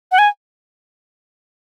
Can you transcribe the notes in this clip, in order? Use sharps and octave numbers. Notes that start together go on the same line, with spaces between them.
F#5
G#5